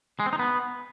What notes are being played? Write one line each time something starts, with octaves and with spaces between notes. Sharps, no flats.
G#3
C4
D#4
B3